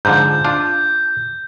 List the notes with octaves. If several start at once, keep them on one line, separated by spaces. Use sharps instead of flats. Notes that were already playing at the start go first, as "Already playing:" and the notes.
G#2 D3 F3 G6
D4 F4